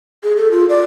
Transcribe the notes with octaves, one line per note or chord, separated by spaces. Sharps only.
G#4
A4
F4
D5